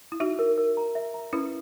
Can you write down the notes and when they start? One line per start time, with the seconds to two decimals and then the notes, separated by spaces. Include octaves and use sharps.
0.12 E4
0.20 D#4 F#4 E5
0.39 A#4
0.58 A#4
0.77 A#5
0.95 E5
1.14 A#5
1.33 C#4 E4 B4